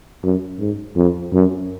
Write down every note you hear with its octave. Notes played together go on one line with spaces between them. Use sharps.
F#2
G#2
F2
F#2